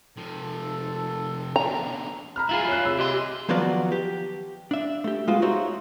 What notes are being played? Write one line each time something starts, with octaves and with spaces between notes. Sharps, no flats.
G#1 G#2 C3 F3 A4
B2 D3 A#5
A#5 B5 F6
E4 F4 G#4
C#5 F#6
C3 B5 E6
G4 D#5 C6
D#3 F3 F#3 B3 F#4 D5
G4
D4 E5
A3 G4
G#3 B3 F4 F#4
D#4 F#4 G4 C5 C#5 E5